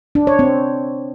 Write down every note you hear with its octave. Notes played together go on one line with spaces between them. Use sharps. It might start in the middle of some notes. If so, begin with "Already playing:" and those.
D4
C#5
C4